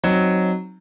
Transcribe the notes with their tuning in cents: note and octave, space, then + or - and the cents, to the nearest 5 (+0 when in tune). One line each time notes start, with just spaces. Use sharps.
F#3 +0 C4 +10 D#4 +0